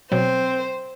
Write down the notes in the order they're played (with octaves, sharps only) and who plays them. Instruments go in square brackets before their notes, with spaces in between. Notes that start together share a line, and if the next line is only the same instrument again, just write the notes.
[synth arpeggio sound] B2 F#3 [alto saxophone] C4 [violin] C5